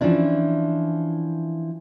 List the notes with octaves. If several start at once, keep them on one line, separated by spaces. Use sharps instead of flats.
E3 F3 C#4 D4 E4